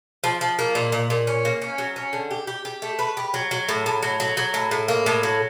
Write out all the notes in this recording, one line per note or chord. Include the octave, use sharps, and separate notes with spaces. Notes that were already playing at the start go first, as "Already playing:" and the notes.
F3
F3
A#3
A#2
A#2
A#2
C#4
A#3
C#4
F#3
C#4
D3
G4
G4
G4
A3
B4
G4
F#3
F#3
A2
A2
F#3
F#3
F#3
A2
A2
A#3
A2
F#3